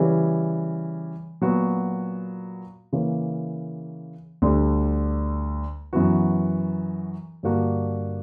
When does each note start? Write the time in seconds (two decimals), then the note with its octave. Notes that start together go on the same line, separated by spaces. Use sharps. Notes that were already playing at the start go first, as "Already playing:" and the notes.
Already playing: C#3 E3 G3 C#4
1.41 A#2 F#3 B3 F#4
2.93 C#3 E3 A#3 C#4
4.42 D2 D3 G3
5.93 F#2 E3 B3 F#4
7.43 G2 D3 A#3 D4 F#4